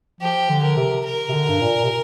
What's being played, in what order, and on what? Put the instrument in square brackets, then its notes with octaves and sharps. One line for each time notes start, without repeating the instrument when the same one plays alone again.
[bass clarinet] F3 [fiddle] G4
[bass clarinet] D3
[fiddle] A#4
[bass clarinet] C3
[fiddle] A#4
[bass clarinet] C3
D3
G2
A#2
C3